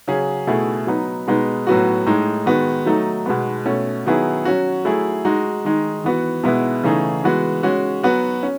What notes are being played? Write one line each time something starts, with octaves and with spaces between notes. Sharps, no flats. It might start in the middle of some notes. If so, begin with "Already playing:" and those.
C#3 F#3 C#4 G#4
B2 A3 E4 G#4
F#3 B3 D#4
B2 G#3 B3 D#4
A2 F#3 B3 F#4
A2 G#3 D#4
D#3 G#3 B3 F#4
F#3 A3 D#4
B2 G#3 B3
B2 A3 C#4
D#3 F#3 B3 E4 G#4
F#3 C#4 F#4
F#3 A3 E4 G#4
G#3 D#4 F#4
D#3 G#3 D#4
E3 B3 F#4
B2 G#3 B3 E4
C#3 E3 A3 D#4 G#4
E3 G#3 B3 F#4
G#3 C#4 F#4
F#3 B3 F#4
C#4